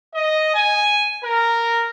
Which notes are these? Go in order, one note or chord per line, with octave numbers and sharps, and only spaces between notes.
D#5
G#5
A#4